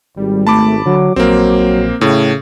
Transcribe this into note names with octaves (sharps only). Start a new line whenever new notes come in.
G#1 G3
A3 A5 B5 D6
D3 F#3
A#1 F#3 A#3 C4
A2 C#3